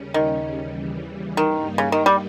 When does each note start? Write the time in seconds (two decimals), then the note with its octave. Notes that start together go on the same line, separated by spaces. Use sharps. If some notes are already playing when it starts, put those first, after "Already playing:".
Already playing: D#2 C#3 G3 C#4
0.14 D#3
0.55 D#2 C#3 E3 G3
1.37 G2 D#3 G3 A#3 D#4
1.78 C#3
1.92 D#3
2.06 G3